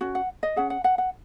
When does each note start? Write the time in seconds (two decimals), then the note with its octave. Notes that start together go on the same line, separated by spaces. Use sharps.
0.01 C#4 F#4
0.15 F#5
0.43 D#5
0.56 C#4 G#4 F#5
0.70 F#5
0.84 F#5
0.98 F#5